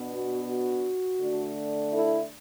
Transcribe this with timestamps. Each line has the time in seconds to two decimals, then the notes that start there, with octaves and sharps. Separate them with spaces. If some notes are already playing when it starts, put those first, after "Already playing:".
Already playing: B2 B3 D4
0.12 F#4
0.49 F#4
1.21 D3 A3 D4
1.94 E4 A4